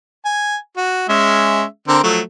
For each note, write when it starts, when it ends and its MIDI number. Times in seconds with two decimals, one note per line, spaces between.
0.25 0.57 80
0.77 1.08 66
1.09 1.64 56
1.09 1.64 61
1.09 1.64 76
1.88 1.99 50
1.88 1.99 60
1.88 1.99 70
2.03 2.20 53
2.03 2.20 54
2.03 2.20 57